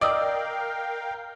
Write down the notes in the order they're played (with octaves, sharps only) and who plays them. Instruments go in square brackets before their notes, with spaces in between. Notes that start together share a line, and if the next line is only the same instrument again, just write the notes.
[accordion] A#4 F5 G5 [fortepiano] D5 [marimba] D#5 D#6 E6